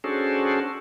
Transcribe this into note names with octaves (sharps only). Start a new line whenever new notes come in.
C#4 D4 F#4 G#4 A4 C5